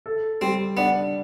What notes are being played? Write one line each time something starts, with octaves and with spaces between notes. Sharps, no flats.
A4
G3 C4
B3 D4